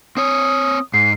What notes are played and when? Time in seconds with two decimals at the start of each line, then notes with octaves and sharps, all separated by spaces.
0.17 C4 C#5 D#6
0.94 G#2 C7